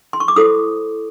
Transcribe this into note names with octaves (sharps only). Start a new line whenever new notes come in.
C6
C#6
D6
E4 A4 C5 D#6